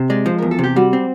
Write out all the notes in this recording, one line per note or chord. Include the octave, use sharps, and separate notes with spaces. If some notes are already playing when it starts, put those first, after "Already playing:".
Already playing: C3
G#3 D5
F3 C5
E2 A#4
A4
C3 G4
G3 F#4
C4